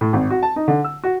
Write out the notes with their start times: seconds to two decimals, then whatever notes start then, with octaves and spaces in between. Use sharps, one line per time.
0.01 A2
0.13 G#1
0.30 F#4
0.43 A5
0.56 D#4
0.68 D3
0.84 E6
1.04 F#4